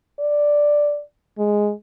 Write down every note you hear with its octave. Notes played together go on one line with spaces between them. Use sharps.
D5
G#3